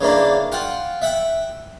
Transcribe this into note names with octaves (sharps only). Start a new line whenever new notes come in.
C#3 E3 A#3 D4
F4 F#5 G5
E5 F#5 G5